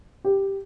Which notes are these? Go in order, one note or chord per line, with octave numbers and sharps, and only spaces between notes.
G4